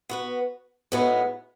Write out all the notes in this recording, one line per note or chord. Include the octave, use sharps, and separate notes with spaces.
B3 F#4 B4
A2 G#3 B3 D#4 F#4